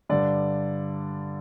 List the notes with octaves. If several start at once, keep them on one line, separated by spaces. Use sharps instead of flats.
G2 D3 D5